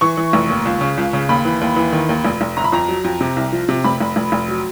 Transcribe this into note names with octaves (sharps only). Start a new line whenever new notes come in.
E3 C#6
E3
F1
D#2
C#2
C#3
C#2
C#3
D#2 B5
E3
D#2
E3
D#3
D#2
F1
F1
G1 A#5
B5
F2 A#5
F#3
F2
C3
C2
F3
C3
F1 B5
F1
F1
F1
F#3